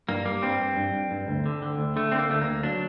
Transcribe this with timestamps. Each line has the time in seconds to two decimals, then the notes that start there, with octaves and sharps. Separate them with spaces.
0.09 G2 A#3
0.26 G3 A#3
0.42 G2 C4
0.60 G2
0.77 G2
0.94 G2
1.11 G2
1.28 D2
1.46 D3
1.62 D3
1.79 D2
1.96 D3 A3
2.12 D3 C4
2.19 A#3
2.30 D2 A3
2.41 A#3
2.47 D2
2.63 F#3 D4